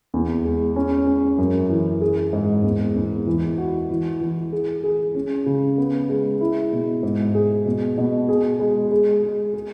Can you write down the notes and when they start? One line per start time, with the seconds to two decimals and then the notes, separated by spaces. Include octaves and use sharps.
0.14 E2
0.45 G#3
0.76 C#4
1.07 C#4
1.38 F#2
1.70 E3
2.01 G#4
2.33 G#2
2.64 E2
2.96 E2
3.27 E3
3.58 F#4
3.90 E3
4.21 E3
4.53 G#4
4.83 G#4
5.15 C#4
5.46 C#3
5.78 B3
6.09 G#3
6.41 E4
6.72 B2
7.03 G#2
7.35 G#4
7.66 B2
7.98 B2
8.29 G#4
8.60 G#3
8.91 G#3
9.23 G#3
9.54 G#4